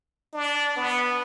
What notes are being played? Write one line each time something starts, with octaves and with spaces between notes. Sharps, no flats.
D4
B3